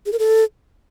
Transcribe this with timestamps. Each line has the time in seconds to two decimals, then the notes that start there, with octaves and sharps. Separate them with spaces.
0.06 G#4
0.12 A#4
0.19 A4